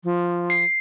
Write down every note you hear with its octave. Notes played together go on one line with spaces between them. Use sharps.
F3
C7